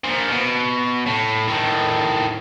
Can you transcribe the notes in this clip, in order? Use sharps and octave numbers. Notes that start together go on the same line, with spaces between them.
A#2 F3
B2
A2
A2 D#3